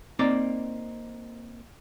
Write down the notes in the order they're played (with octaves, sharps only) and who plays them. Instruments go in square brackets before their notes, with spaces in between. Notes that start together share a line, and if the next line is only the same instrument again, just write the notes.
[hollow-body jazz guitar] A#3 C4 D#4 D5